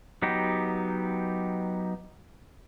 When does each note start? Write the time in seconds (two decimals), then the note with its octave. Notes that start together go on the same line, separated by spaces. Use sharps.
0.22 F#3 B3 D#4 G4